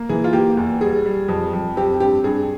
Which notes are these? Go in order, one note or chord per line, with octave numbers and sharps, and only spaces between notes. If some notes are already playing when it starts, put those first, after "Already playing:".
Already playing: A#3
E3 G#4
F4
A#3 G4
E2
G3 G#4
G3
F2
F2
C4 G4
G2 G4
G2 G#4